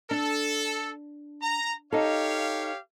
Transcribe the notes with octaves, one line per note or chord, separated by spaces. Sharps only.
D4 A4
A#5
D#4 G4 A4 C#5 F5